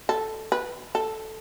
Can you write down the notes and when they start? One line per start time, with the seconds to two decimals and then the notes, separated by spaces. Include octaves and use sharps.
0.09 A4
0.52 B4
0.95 A4